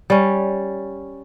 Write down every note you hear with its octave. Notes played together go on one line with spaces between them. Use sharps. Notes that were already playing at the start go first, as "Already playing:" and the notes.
G3 C#4